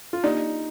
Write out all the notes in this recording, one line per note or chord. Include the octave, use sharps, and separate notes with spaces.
F4
A#3 D4 D#4 G4 D5